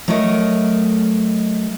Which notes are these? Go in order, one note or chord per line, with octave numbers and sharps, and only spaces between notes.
F#3 A3 A4 A#4 D#5